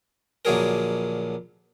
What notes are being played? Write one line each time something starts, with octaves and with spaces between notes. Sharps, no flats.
A#1 D3 F#3 G#4 A#4